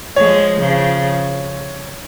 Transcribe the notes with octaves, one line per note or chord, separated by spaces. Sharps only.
F3 G#3 C#5
C#3 F3